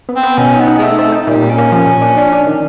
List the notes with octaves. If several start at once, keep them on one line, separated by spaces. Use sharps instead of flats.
B3
C4
B3
B2 C#4
D#4
B3
D#4
G#3
A3 D#4
A3 C4
D#4
A#2 G3
A#2
C#4
A#3
F3 C#4
A#2
D4
D4
D4
D#3